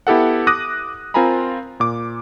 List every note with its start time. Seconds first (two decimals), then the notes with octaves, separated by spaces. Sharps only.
0.07 B3 E4 G4 A4 F#5
0.47 D6 D#6 F#6 A#6 D#7
1.14 C4 F4 A#4 G#5 A#5 B5
1.80 A#2 D6